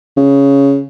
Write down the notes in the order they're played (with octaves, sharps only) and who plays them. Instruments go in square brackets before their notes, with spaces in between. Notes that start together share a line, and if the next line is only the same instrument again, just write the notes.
[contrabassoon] C#3